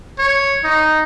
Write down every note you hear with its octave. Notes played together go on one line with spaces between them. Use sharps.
C#5
D#4